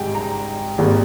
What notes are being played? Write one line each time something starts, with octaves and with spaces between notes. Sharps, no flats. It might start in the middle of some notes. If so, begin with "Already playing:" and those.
Already playing: G#1 G#2 G3 G5 G#5
A#5
G#1 G#2 G3 A#3